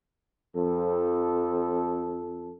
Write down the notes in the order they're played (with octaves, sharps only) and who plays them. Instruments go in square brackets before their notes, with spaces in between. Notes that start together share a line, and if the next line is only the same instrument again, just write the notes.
[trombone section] F2 A4